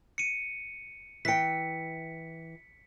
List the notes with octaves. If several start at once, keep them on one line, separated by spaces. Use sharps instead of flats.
C#7 D#7
E3 G5 B6 C#7